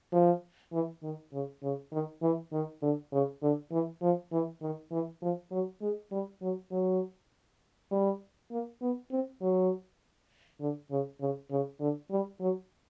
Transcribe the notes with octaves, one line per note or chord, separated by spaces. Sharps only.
F3
E3
D#3
C#3
C#3
D#3
E3
D#3
D3
C#3
D3
E3
F3
E3
D#3
E3
F3
F#3
G#3
G3
F#3
F#3
G3
A#3
B3
C4
F#3
D3
C#3
C#3
C#3
D3
G3
F#3